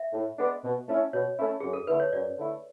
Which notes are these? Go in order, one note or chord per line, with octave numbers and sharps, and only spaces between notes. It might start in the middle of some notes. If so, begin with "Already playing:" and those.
Already playing: E5
A2
G#3 B3 D4
B2
A3 C#4 E4
B2 C#5
A3 C#4 E4
F#2 G#4
A4
D3 A3 E4 B4
C#5
F#2 D5
D3 A3 E4